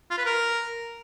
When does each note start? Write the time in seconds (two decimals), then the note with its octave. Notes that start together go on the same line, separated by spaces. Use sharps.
0.10 F4
0.18 B4
0.25 A#4